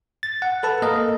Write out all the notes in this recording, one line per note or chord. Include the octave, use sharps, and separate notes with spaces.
A6
F#5
A4 B4 A5
A#3 A4 A#4 D#5